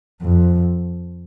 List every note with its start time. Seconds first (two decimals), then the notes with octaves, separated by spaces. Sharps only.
0.23 F2